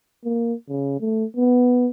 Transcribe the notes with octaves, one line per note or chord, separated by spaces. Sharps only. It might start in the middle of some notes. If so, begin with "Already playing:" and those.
A#3
C#3
A3
B3